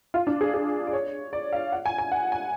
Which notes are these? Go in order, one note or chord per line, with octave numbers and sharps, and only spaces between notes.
F4
D4
G#4
G#4
D5
C#5
D5
F5
F#5
G#5
G#5
F#5
G#5